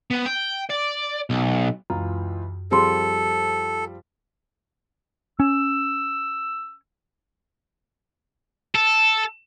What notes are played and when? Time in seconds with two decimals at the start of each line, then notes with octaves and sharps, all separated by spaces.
0.11 B3
0.25 G5
0.69 D5
1.30 B1
1.90 C#2 F#2 E3 F4
2.71 F3 G3 C4 G#4 A4 C6
5.40 C#4 E6
8.75 A4